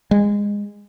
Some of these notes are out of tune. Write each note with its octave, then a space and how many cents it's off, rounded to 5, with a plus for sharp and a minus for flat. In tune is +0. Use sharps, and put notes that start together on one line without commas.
G#3 -20